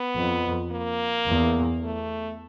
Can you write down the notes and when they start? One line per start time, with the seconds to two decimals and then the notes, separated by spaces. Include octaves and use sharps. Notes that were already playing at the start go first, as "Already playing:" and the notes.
Already playing: B3
0.17 F2
0.72 A#3
1.28 E2
1.83 A3